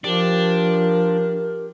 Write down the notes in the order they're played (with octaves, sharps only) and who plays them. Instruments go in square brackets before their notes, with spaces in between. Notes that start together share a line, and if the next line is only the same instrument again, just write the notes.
[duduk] F3 [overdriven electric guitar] D4 [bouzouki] G4 [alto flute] A#4